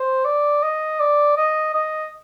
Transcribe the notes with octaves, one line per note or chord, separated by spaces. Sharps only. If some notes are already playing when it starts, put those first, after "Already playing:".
Already playing: C5
D5
D#5
D5
D#5
D#5